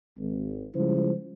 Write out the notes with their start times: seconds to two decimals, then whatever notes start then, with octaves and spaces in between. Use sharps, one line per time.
0.18 G#1
0.75 C#3 F3 G3 G#3 E4 C5